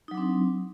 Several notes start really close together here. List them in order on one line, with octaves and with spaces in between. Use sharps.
D#4 F#3 D4 C4